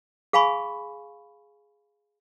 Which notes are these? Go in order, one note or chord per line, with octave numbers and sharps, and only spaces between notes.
G#4 F5 G#5 B5 C#6